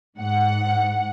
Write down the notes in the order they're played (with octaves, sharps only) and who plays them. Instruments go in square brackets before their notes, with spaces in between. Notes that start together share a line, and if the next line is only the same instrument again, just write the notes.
[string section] G#2 F#5